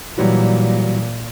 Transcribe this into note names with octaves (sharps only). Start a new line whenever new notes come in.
A#2 E3 F#3 G3